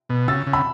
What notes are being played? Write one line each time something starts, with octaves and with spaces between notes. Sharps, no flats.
B2
C#3 E6 A6
C#3
B5 E6